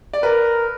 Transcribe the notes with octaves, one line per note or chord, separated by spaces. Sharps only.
D5
A#4 B4